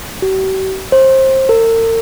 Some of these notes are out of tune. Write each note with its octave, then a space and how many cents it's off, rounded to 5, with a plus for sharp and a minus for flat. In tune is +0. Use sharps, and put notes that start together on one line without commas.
G4 -45
C5 +25
A#4 -45